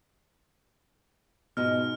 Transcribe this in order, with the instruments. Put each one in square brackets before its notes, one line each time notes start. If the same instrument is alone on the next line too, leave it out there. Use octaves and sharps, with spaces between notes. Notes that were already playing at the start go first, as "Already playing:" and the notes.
[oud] G#2 D#4 F4 [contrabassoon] B2 [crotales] F6